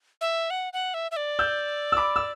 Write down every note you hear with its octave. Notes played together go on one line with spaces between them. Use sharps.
E5
F#5
F#5
E5
E5
D5
E6 G6
E6
B5 D6
E6